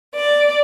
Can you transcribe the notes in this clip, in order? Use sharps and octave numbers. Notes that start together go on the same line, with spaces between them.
D5